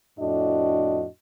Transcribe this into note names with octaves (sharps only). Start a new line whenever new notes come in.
F2 A2 D4 F#4 D#5